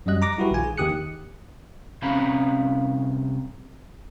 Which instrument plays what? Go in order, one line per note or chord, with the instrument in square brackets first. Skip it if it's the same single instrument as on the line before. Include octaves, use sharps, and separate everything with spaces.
[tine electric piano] F#2 F#3 G3 D#5 F#6
A#5 D6 A#6
G3 E4 F#4 G4 B4
A#1 D#3 F4 G#5
G#4
D#2 D#3 G4 D#6 F#6 C#7
[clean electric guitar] C2 C4 C#4 F5 A#5 B5